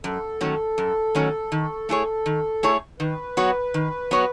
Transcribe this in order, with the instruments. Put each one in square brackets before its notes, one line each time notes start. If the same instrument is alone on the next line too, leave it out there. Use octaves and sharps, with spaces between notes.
[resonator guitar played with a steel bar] F#2 [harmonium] A4
[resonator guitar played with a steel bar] D#3 F#3 A3 C#4
F#2
D#3 F#3 A3 C#4
D#3
A3 E4 G#4 C#5
D#3
A3 E4 G#4 C#5
[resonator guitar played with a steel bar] D#3 [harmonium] B4
[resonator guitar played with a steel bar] F#3 B3 F#4 C#5
D#3
F#3 B3 F#4 C#5